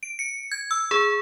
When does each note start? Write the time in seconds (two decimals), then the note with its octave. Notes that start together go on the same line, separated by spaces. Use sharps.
0.03 D7
0.19 C#7
0.52 G#6
0.71 E6
0.91 G#4